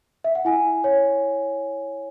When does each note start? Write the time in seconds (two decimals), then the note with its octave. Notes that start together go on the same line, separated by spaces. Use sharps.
0.24 E5
0.35 F#5
0.45 E4 G#5
0.84 C#5